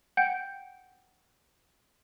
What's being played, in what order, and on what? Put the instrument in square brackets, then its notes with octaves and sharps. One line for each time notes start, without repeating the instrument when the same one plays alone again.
[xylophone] F#5 G5 G6